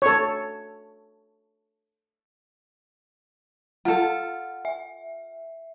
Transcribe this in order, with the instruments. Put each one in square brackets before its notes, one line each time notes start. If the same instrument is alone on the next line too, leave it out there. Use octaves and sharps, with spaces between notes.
[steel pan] A4 C#5
[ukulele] F4 A4 [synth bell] F#5
[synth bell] E5